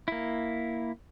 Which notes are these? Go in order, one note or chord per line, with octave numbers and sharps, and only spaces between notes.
A#3 E4